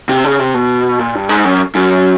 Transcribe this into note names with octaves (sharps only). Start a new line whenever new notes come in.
C3
C#3
C3
B2
A#2
G2
G#2
F#2
F#2